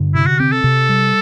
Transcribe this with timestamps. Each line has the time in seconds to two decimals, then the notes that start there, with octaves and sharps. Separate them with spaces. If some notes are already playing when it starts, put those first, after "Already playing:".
Already playing: G2 D3
0.14 C3 E4
0.27 F#4
0.39 C4 G4
0.52 A4
0.64 C3
0.89 G3